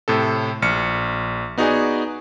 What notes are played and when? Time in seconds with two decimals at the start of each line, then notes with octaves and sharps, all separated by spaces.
0.08 A2 C3 A4
0.62 A#1 F6 C#7
1.58 B3 D#4 F#4 G#4 D5 G#5